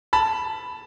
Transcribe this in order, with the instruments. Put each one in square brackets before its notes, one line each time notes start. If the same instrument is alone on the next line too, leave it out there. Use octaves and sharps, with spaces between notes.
[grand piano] A5 B5